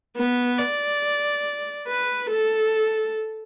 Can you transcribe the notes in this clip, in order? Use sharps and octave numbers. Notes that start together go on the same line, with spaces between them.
B3
D5
B4
A4